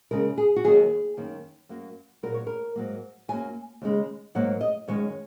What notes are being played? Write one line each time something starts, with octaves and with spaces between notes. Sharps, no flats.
D#2 C#3 G#3 A#4
G#4
F#4
D#2 D#3 F#3 A#3 G#4
F#2 D#3 A#3
F#2 F#3 A#3
A#2 F#3 A#3 A#4
C#5
A#4
G#2 F#3 A#3
F#2 F#3 A#3 G#5
D#2 C#3 G#3
G#2 F#3 A#3 F#5
D#5
F#2 D#3 G#3 C#5